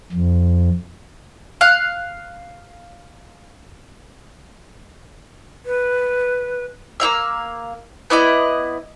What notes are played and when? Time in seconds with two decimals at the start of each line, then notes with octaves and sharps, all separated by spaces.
0.12 F2
1.61 F5 F#6
5.66 B4
7.00 A#3 E4 F5 E6
8.10 B3 E4 D5 D#5